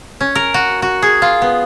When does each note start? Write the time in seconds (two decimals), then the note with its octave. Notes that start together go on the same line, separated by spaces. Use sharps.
0.20 C#4
0.35 A#4
0.54 F#4
0.82 F#4
1.02 G#4
1.22 F4
1.42 B3